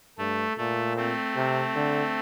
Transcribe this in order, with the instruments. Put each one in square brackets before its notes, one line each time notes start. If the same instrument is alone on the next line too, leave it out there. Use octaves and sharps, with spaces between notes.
[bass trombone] G2 [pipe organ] A3
[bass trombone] A#2 [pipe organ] A3
[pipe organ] A3 C4
[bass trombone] C3
D3